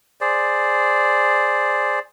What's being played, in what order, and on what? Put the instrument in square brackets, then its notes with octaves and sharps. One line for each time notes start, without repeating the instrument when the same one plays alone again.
[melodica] G#4 C5 D5